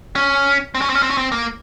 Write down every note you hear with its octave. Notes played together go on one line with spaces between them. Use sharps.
C#4
C4
C#4
C4
C#4
C4
C#4
C4
A#3